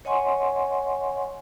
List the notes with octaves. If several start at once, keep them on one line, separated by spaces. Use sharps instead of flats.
C#5 D#5 F#5 G#5 C6 C#6